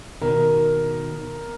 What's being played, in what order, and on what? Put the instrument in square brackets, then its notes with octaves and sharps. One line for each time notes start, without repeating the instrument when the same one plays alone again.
[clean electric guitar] B2 D#3 [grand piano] A#4